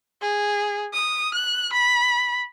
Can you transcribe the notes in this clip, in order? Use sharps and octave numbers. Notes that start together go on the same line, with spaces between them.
G#4
D#6
F#6
B5